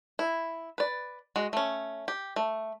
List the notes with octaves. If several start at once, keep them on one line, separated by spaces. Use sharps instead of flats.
E4
B4 D5
G#3 F#4
A3 C#4
G4
A3